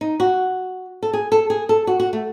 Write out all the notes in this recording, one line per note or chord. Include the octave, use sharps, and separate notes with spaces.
D#4
F#4
A4
G#4
A4
G#4
A4
F#4
F#4
A3